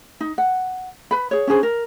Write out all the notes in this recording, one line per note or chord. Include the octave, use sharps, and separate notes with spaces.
D#4
F#5
B4 B5
G#4 C#5
C#4 D4 G#4 C5
A#4